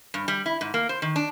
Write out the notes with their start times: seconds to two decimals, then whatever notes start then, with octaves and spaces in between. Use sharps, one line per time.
0.14 G2
0.28 G3
0.46 E4
0.61 G#2
0.74 A#3
0.89 C5
1.02 D#3
1.16 D4